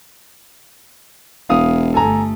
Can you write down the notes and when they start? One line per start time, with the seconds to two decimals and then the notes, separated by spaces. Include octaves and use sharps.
1.49 E1 E4 F5 D#6
1.94 G1 A3 A4 G#5 A#5